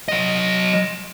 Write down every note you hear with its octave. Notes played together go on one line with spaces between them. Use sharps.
F#3 D#5